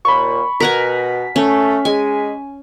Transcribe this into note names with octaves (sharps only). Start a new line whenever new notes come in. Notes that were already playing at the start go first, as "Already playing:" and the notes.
D#2 A#2 B5 C#6
B2 A#4 F#5 G#5 B6
A3 C#4
G#3 G#5